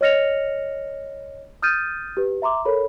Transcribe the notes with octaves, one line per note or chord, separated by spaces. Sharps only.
C#5 D#5 F6 A#6 C#7 F7
D#6 F6 G6 A6 D#7
G4 B4
E5 A#5 C6 D6
A4 A#4 C#5 B5